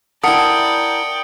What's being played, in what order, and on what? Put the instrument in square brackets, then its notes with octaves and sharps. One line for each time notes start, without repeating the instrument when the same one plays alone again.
[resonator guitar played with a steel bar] E4 A#4 [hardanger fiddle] D5 G5 [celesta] F#5 A5 [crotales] D#6 C#7